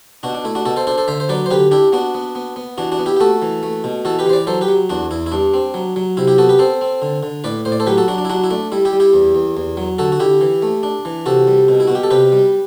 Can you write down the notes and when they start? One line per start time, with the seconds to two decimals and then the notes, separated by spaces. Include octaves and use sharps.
0.23 B2 D4 F#4
0.34 D4
0.44 A3 E4
0.55 D4 F#4
0.65 B2 F#4 A4
0.76 A4 C5
0.87 D4 A4 C5
0.98 A4 C5
1.08 D3 C5 E5
1.20 C5
1.29 F#3 B4 D5
1.46 C5
1.51 D3 G4 B4
1.71 D4 E4 G4
1.93 B3 D4 F#4
2.14 B3
2.35 B3
2.56 B3
2.78 E3 D4 F#4
2.92 D4 F#4
2.99 B3
3.06 E4 G4
3.16 G4
3.20 A3 F#4 A4
3.42 E3
3.63 A3
3.84 B2
4.05 E3 F#4 A4
4.19 G4 B4
4.26 E3 C5
4.33 B4 D5
4.47 F#3 A4 C5
4.61 G4 B4
4.68 F#3
4.89 E2 D4 F#4
5.11 E2 E4
5.26 E4
5.32 G2 D4
5.54 C4
5.74 F#3
5.96 F#3
6.17 C3 E4
6.28 E4 G4
6.38 B3 F#4 A4
6.49 G4 B4
6.59 C4 A4 C5
6.81 C4
7.02 D3
7.23 D3
7.44 A2 B4 D5
7.65 A2 C5
7.72 D5
7.80 A4 C5
7.87 F#3 G4 B4
7.97 F#4 A4
8.08 F#3 D4 F#4
8.18 D4
8.25 E4
8.29 F#3 D4 F#4
8.44 E4
8.50 A3 D4
8.72 G3 E4
8.85 E4 G4
8.93 G3
9.00 E4 G4
9.13 E2
9.35 E2
9.57 E2
9.77 F#3
9.99 D3 F#4 A4
10.12 F#4
10.20 D3 E4 G4
10.41 E3
10.62 A3
10.83 D4
11.05 E3
11.26 C3 F#4 A4
11.47 G3
11.68 B2
11.80 E4
11.88 B2 F#4
11.95 G4
12.03 A4
12.10 C3 G4 B4
12.32 G3